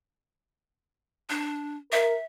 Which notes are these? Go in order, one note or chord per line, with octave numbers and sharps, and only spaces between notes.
D4
A#4 E5